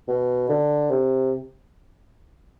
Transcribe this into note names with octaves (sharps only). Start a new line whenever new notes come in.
B2
D3
C3